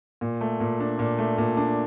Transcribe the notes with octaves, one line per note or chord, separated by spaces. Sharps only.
A#2
A3
A#2
D4
A#2
A3
A#2
D4